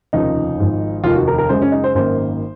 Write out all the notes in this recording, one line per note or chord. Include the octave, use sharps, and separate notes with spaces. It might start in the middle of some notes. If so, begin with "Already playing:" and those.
F1 D#2 C#3 F3 D#4
G#1 G#2 F3
F1 D#2 D#3 F4
F#4
A#4
A#4
F#2 C#3 G#3 C5
C#4
D#4
C5
G#1 F#2 D#3 A#3 C5